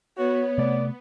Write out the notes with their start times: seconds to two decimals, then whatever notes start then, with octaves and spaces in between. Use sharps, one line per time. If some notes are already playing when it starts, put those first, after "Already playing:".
0.17 B3 F#4 C#5
0.58 C3 A3 D5